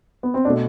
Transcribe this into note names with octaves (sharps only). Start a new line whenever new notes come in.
B3
C4
B2 A3 D4